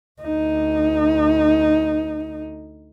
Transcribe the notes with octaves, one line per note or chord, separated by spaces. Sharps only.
D2 D#4